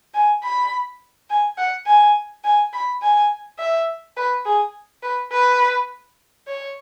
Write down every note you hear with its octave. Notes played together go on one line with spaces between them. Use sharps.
G#5
B5
G#5
F#5
G#5
G#5
B5
G#5
E5
B4
G#4
B4
B4
C#5